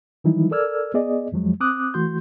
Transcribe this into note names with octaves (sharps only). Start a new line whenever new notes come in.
D#3 E3 F#3 G3 D#4 E4
A4 A#4 D5 E6 F6 G#6
B3 G#4 D5 D#5
F2 F3 F#3 G#3
C4 D6 D#6 F#6
E3 A3 F#4 C6 G6